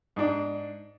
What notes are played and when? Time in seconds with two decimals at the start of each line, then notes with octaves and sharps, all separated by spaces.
0.16 G#2 D4